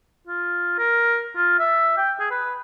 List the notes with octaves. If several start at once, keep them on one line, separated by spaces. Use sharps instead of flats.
F4
A#4
F4
E5
G5
G#4
B4